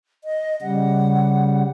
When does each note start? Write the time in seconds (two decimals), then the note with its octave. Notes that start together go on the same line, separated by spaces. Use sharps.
0.24 D#5
0.62 C#3 G3 F#5